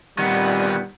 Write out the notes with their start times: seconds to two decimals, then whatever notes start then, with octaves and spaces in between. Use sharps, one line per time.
0.19 A#2 D#3 G3 B3 C4 F#5